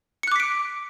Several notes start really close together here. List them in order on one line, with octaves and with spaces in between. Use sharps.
C#7 F#6 D6 B6 D7